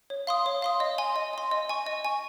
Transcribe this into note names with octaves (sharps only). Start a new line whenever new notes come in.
C#5
F5 C6 D#6
C#5
F5 C6 D#6
D#5
G#5 C6
D#5
G#5 C6
D#5
G#5 C#6
D#5
G#5 C#6